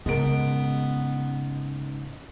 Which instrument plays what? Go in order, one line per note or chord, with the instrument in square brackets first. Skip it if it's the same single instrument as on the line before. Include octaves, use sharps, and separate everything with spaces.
[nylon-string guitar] G#2 A#4 [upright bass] C#3 [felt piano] G#3 D7 [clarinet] B3